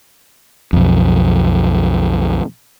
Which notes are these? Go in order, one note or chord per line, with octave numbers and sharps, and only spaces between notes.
B1 F2